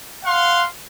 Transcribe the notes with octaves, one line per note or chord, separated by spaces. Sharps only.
F5 F#5 C6